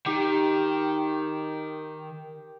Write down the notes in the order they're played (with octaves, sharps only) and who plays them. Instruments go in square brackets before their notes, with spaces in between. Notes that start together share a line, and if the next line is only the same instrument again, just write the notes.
[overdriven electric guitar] D#3 [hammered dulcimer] G4